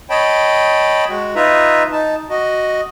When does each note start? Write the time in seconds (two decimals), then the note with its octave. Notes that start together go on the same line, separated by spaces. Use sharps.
0.10 C#5 D#5 G5 A5 B5
1.09 G#3 F#4
1.35 D#4 F4 B4 E5 A#5
1.92 D#4 A5
2.30 F#4 D#5